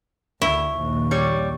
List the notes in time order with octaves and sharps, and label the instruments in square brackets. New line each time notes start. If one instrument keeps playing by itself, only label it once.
[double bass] D2 [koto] E4 [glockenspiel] C#6
[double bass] A#1 D#2
[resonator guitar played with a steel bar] G3 C#5